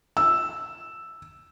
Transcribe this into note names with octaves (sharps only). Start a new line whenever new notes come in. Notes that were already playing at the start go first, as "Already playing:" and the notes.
E6